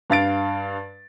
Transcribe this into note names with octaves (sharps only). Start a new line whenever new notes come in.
G2 F5 A6 D7